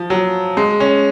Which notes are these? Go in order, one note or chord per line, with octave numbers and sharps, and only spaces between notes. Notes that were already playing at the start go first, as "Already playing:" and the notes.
Already playing: F3
F#3
G#3
C#4